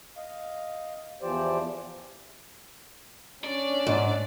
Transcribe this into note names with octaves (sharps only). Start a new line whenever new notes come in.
D#5 F5
E2 E3 F3 G4 C5 D5
C#4 D4 D5
G#2